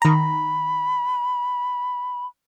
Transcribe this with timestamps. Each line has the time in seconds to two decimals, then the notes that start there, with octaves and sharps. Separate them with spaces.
0.02 D#3 A#5 B5